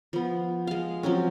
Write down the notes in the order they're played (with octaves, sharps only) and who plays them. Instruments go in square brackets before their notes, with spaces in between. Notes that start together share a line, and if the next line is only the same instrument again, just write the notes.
[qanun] F3 B3
G#3 F5
F3 F#3 C4 C#4